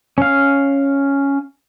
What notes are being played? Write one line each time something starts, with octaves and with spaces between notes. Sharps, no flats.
C#4 F5